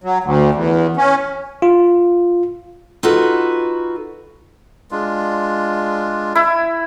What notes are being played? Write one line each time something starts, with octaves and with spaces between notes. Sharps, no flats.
F#3
D2
E2
C#4
F4
D#4 F4 F#4 A4 B4
G#3 D4 F4
E4